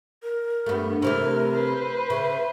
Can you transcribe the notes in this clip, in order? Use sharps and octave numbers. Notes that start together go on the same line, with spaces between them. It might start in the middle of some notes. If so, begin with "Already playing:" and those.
A#4
G2 A3 B3
C3 E3 A3 E4 A#4 F6
B4 C5
C#3 E5